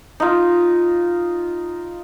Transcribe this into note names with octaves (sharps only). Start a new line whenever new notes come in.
D#4 F4